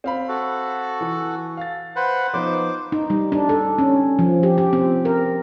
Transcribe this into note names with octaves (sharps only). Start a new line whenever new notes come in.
C4 F5 B5
F#4 A4
E3
F5 A6
B4 C5 F#5
F3 B3 D#4 C5 D6
D#4
G3
D4
A4
C#4
F3
G4
G4
C4
A#4